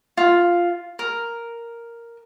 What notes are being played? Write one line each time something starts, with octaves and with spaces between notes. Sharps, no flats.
F4
A#4